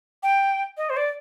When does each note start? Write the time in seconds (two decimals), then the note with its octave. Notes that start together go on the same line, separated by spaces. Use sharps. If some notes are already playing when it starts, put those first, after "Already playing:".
0.23 G5
0.77 D#5
0.90 C5
0.97 D5